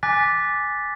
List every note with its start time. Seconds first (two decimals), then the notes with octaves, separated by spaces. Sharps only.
0.03 G#5 D6 F#6 A6 B6